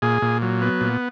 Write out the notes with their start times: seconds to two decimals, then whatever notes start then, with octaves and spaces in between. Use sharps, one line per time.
0.02 A#2 G#4
0.22 A#2
0.42 F#3
0.61 B3
0.81 A#2